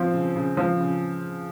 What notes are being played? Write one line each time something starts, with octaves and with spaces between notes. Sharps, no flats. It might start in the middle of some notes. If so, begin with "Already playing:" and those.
Already playing: F3 C4
C#3
C#3
F3
C#3